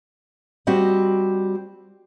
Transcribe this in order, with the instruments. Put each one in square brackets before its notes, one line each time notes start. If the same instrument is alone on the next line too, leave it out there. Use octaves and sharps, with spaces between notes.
[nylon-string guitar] G3 C4 F#4 G4 D#5